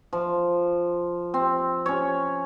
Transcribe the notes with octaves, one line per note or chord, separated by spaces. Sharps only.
F3
C4
C#4 C#5